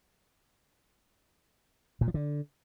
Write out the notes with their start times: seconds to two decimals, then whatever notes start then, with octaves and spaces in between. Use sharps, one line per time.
2.01 A#2
2.08 F3
2.14 D3